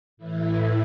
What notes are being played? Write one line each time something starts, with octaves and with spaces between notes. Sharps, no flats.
A2 E3 E4
E4